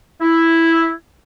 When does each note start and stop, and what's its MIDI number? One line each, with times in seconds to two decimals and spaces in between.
0.21 0.90 64